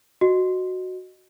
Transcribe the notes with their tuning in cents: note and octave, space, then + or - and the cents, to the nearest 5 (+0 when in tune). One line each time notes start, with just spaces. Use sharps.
F#4 +0 D#5 -15